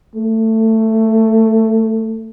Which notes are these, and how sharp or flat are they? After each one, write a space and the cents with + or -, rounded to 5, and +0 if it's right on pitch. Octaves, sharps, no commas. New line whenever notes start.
A3 +15